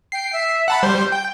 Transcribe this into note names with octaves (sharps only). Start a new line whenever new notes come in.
G5 C7
E5
F#5 A5 B5
G3 C5 G6
G5